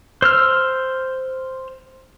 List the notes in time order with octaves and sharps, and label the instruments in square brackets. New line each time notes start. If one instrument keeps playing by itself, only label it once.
[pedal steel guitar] C5 E6 F6